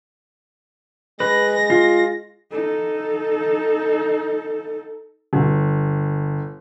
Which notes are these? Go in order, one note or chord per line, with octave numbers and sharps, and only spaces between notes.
G#3 B4 A#6
F4
D#4 A4
G1